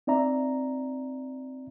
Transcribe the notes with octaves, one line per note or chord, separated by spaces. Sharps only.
C4 D#4 D5 E5 A#5